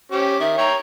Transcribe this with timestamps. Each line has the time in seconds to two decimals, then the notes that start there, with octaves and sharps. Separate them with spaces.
0.12 C#4 G4 C5
0.40 D#3 E5
0.58 C#5 G5 A#5